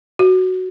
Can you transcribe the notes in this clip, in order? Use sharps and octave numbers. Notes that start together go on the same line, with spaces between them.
F#4